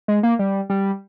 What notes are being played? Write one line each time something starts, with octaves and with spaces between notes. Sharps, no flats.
G#3
A#3
G3
G3